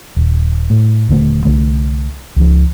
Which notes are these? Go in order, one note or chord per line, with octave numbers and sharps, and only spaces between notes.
D#1
A2
D#1 D3 A3
C2 D3 A3
C#2 F3